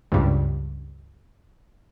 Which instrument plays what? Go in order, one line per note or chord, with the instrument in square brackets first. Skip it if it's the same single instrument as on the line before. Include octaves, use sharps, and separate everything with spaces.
[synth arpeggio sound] C#2 G2